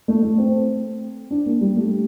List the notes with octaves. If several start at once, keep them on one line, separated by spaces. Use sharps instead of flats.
A3
A3
C4
D4
A#3
G3
A3